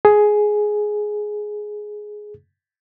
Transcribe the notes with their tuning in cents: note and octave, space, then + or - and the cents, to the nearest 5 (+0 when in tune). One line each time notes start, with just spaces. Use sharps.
G#4 +10